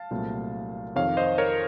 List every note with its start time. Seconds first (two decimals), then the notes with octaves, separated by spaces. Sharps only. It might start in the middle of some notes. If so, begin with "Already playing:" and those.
Already playing: F5 A5
0.11 C2 A#2 F#3 A3 C4
0.95 F2 C3 D#3 C#5 F5
1.17 C5 D#5
1.38 A#4 C#5